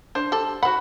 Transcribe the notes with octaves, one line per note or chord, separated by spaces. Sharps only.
D4 C5
G3 A4
F#4 C5 F#5 B5